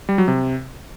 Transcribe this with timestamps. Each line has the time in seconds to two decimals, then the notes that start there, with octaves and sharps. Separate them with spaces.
0.09 G3
0.18 F#3
0.28 C3